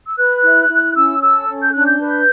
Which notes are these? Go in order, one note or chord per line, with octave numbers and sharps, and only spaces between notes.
E6
B4 F#6
E4
E4
C#4 E6
A4 E6
C#4
G6
D4 F#6
G6
B4